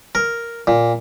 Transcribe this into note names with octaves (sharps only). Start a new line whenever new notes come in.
A#4
A#2